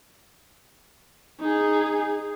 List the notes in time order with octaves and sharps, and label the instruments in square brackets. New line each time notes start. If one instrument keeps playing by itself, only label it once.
[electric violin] D#4 G#4